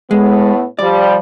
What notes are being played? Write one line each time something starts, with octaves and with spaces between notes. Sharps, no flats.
A2 G#3 B3
F3 G3 D5